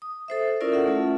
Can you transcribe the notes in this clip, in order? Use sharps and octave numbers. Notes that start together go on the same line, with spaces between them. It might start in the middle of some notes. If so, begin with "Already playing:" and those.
D#6
A4 C5 E5
C#4 E4 F4 A#4 D5 E5
A4 E5 F#5
A3 C#4 F4